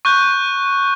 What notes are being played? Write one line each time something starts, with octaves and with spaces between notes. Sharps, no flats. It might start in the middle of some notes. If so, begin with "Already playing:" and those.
C#6 F#6 G6